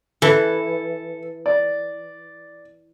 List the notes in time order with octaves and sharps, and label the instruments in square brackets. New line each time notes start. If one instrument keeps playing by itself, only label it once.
[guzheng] E3 [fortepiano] A4
[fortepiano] D5